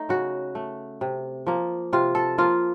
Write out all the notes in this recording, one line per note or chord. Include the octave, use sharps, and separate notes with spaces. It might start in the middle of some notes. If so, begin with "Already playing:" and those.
Already playing: A3 D#4
C#3 F#4
A3
C3
F3 A#3
C3 F4
A4
F3 A#3 F4